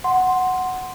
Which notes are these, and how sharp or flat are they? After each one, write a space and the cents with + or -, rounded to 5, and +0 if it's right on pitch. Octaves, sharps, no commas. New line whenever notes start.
F#5 +0 C6 +0